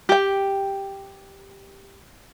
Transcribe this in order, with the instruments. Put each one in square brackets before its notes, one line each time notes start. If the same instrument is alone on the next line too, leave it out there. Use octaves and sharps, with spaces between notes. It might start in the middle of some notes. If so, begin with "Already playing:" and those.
[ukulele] G4 G5